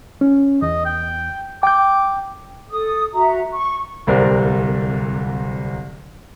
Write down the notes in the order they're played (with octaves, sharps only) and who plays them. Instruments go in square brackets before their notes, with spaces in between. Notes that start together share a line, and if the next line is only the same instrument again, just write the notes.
[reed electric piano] C#4
[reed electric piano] E2 [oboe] D#5
[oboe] G5
[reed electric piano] G5 G6 [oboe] D6
[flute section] A4 D#6
F#4 E5 A#5
C#6
[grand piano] D1 C2 C3 A#4 D5